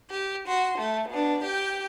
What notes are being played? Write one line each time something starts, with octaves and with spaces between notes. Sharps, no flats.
G4
F#4 C6
A3
B2 D4
G4 G5